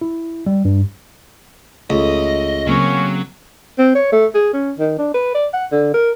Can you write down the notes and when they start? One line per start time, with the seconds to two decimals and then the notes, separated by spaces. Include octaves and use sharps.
0.01 E4
0.46 G3
0.65 G2
1.90 C#2 A3 D#5
2.67 C#3 F#3 A#3 C4 C#4
3.79 C4
3.95 C#5
4.12 A3
4.35 G#4
4.53 C#4
4.79 D#3
4.98 D4
5.14 B4
5.34 D5
5.53 F#5
5.72 D3
5.94 A#4